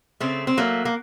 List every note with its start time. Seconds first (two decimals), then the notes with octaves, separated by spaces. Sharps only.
0.20 C#3 A3 C4
0.47 C4
0.57 F#3 A3 A#3
0.85 A#3